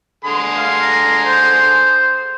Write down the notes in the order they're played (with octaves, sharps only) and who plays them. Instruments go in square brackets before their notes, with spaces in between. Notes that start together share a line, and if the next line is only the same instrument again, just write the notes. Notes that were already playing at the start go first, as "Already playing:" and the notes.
[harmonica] D3 G#4 C6
[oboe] F5
A#5
C5